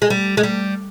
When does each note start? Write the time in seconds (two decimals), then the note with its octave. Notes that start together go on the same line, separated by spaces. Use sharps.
0.02 G#3
0.10 G3
0.37 G#3
0.43 G3